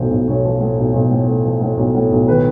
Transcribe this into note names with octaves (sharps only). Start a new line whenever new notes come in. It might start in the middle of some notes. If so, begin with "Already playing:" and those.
Already playing: B1 A2 F3 C5
B1
B1 C#5
F3
A2
B1
B1
A2
A2
F3
A2
B1
A2
B1
D#3 B4